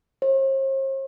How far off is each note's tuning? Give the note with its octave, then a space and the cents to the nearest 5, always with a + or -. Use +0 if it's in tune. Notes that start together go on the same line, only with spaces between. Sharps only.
C5 +45